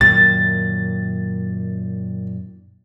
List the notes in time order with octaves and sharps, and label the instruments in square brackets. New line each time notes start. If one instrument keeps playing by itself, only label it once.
[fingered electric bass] F#2 A#2 D#3 [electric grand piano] A6